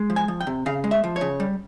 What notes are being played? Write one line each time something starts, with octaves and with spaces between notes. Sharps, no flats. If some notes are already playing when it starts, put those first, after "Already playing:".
Already playing: G#3
F3
G#5
F3
G5
C3
C#3 F5
G#3
E5
F3
C#5
C#3
G3